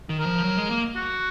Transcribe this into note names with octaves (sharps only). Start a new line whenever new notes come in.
D#3
A#4
F3
F#3
G#3
A#3
F#4